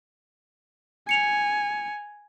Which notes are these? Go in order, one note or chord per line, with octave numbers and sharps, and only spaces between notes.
G#5 C#7 F7